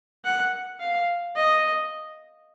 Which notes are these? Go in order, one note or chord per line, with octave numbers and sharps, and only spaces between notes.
F#5
F5
D#5